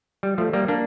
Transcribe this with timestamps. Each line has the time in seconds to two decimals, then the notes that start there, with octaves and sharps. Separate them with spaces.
0.23 G3
0.38 F3 A3
0.53 G3 A#3
0.68 A#3 D4